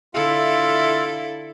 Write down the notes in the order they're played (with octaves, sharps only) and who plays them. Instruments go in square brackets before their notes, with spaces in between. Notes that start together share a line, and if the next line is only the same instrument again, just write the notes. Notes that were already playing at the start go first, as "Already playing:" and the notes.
[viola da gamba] D3 E4 A4 [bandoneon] F4 E5 F5